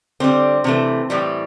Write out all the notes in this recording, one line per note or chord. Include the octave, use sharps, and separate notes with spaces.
D3 G3 C4
C3 E3 A3
A2 E3 G3